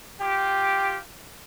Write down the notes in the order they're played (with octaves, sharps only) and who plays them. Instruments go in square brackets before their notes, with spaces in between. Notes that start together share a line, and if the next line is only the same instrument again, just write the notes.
[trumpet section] F4 G4